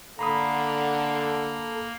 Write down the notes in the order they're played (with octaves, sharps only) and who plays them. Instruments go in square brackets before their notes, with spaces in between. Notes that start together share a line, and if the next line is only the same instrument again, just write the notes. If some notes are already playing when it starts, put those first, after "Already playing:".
[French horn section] D3 [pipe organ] A#3 [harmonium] A4 [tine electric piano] A#5 B5 D#6